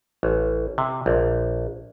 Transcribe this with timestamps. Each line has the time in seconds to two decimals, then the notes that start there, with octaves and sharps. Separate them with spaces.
0.23 A1
0.78 C3
1.06 A#1